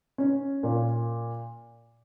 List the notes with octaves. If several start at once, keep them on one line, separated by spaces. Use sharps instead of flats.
C#4
A#2